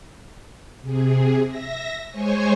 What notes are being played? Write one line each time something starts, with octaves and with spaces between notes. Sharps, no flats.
C3 G#4
E5 A#6
G#3 C5 C#5 G#5 C#6